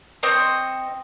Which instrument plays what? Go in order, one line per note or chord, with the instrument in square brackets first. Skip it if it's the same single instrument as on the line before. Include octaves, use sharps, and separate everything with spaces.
[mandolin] C4 D#5 C#6